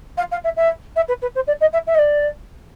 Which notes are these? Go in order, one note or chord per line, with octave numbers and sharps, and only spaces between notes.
F5
F5
E5
E5
E5
B4
B4
C5
D5
D#5
E5
E5
D#5
D5